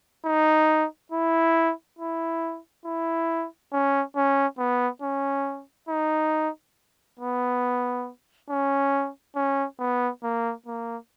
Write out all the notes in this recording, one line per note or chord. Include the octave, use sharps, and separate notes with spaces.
D#4
E4
E4
E4
C#4
C#4
B3
C#4
D#4
B3
C#4
C#4
B3
A#3
A#3